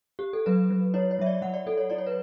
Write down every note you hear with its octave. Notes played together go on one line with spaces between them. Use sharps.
G4
A4
F#3 B4
F#3
E4 C#5
C#5
F#3 E5
D5
F#3 F#5
D5
F#3 A4
C#5
E4 D5
C#5
B4